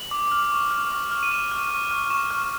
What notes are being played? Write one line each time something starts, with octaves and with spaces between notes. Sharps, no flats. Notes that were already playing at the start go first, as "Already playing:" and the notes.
Already playing: F#7
D6
F6
C#6
F6
C#6
F6
D#7
C#6 E7
F6
C#6
F6
C#6 E7
F6